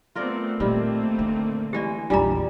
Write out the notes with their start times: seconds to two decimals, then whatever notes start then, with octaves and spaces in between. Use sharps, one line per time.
0.15 A3 B3 C4 F4 A#4 D5
0.60 A#2 D#3 G3 A3 A#3 C4
1.19 D3
1.73 E3 G#3 G4 D5
2.10 A#1 E2 G3 D4 F4 A#5